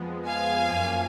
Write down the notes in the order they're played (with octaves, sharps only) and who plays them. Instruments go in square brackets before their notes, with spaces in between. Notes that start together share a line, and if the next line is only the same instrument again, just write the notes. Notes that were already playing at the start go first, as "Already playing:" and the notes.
Already playing: [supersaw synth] F2 F3 G#3 B3
[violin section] F5 G#5
[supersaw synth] F#2 F3 A#3